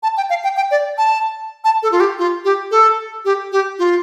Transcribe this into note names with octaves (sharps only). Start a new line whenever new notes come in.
A5
G5
F5
G5
G5
D5
A5
A5
A4
F4
G4
F4
G4
A4
G4
G4
F4